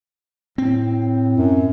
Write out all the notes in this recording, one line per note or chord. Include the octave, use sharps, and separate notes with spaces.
A2 C4
F#2